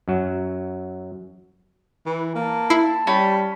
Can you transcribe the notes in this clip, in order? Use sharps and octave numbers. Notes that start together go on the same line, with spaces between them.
F#2 F#3
E3
A#3 A5
E4 C7
G3 C#4 B5